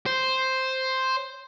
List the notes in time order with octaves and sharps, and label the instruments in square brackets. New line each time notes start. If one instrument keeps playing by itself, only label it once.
[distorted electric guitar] C5